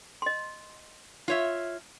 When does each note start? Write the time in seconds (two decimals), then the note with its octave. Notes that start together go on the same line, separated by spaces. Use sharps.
0.22 D#5 C6
1.28 F4 C#5 E5